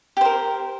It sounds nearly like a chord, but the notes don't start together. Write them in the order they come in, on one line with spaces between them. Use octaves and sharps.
G4 C5 A#4